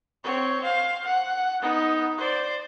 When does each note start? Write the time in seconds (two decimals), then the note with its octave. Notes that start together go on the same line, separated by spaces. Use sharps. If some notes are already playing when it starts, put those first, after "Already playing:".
0.23 C4 C#5
0.62 C5 F5
1.04 F#5
1.62 B3 D#4
2.18 C5 D5